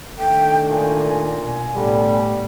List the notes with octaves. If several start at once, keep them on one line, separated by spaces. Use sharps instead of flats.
D#3 A3 D4 G5
A#2 G#5
B2 G#5
A2 D3 G3 B3